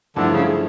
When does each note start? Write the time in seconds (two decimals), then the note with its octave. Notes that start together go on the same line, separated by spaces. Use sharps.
0.16 G2 D3 F3 A3 E4
0.32 C#3